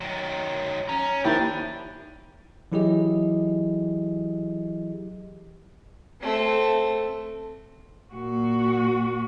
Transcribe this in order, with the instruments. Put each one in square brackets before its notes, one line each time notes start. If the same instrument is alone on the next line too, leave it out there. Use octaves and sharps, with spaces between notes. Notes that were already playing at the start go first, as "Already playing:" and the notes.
[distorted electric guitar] D#3 F#3
[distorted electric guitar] C#4 [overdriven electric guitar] A#5
[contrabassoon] D#2 [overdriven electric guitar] F3 [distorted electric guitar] D4 [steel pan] E4 G5 B5
[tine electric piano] E3 F#3 E4 G4 G#4 D#5
[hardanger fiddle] A3 C4
[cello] A#2 F#4